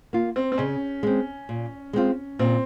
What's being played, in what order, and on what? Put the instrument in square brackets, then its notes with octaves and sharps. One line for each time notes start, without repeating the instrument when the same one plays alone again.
[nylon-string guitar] A#3 F4
[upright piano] C4
C4
[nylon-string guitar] C#3 [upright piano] C#4
[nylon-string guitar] G#3 C4
A#2
G#3 C4 F4
[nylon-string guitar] A#2 [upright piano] C4